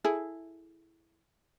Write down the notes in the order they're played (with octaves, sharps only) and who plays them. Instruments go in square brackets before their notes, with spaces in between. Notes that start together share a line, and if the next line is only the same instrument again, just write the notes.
[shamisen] E4 G#4 A4